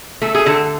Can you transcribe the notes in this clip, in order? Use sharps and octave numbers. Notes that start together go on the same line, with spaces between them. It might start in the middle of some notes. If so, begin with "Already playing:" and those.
A3 A4
G#4
D3 A4